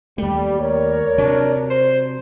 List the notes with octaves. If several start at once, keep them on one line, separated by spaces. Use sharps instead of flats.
D#2 G3 A3
A#4 C#5 D5
C3 F#3 D4
C5